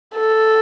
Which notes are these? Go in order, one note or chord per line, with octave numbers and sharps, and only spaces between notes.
A4